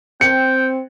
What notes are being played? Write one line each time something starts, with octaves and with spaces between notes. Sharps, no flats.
C4 G5 C#7